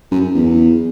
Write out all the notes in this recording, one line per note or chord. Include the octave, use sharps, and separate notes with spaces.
F#2
E2